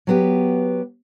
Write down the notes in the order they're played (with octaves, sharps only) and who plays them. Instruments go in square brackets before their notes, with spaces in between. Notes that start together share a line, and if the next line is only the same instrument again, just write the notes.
[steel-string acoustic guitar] F#3 B3 G4